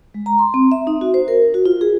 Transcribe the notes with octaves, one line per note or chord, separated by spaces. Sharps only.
G#3
A#5
C6
C4
E5
D#4
F#4
C5
A#4
F#4
F4
G#4